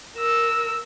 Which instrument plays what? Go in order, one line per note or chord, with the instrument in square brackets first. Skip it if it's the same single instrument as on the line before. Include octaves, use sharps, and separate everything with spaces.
[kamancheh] A#4 E6